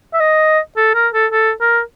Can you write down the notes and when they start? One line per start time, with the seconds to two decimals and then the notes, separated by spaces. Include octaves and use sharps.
0.13 E5
0.20 D#5
0.77 A4
0.95 A#4
1.13 A4
1.32 A4
1.61 A#4